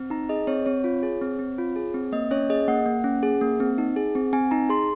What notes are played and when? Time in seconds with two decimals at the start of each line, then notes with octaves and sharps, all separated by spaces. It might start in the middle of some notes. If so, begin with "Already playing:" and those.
Already playing: C4
0.10 D#4 A#5
0.29 G#4 D#5
0.47 C4 C#5
0.66 C4 C#5
0.84 F4
1.03 G#4
1.21 C4
1.39 C4
1.58 F4
1.76 G#4
1.94 C4
2.12 A#3 D#5
2.31 C#4 C#5
2.50 G#4 D#5
2.68 A#3 F#5
2.86 A#3
3.04 C#4
3.23 G#4
3.41 A#3
3.60 C4
3.78 D#4
3.96 G#4
4.15 C4
4.33 C4 G#5
4.51 D#4 A#5
4.69 G#4 C6